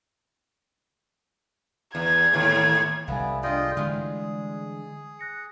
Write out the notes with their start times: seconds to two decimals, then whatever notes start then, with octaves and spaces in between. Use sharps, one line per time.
1.95 E2 G#6
2.33 D#2 A2
3.08 C2 D3 F3 G3 B3 E4 F5 G#5
3.43 D4 F4 G#4 D5 D#5 G5
3.77 D3 E3 G3 G#3 E4 F4 G#4
5.19 F#6 A#6 C#7